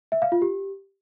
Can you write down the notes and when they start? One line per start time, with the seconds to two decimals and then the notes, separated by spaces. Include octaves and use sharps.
0.12 E5
0.22 F5
0.32 F4
0.42 G4